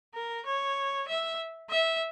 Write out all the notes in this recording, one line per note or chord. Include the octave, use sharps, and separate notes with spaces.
A#4
C#5
E5
E5